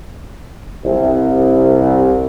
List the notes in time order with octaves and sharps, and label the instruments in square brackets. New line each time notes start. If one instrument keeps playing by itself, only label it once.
[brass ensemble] C2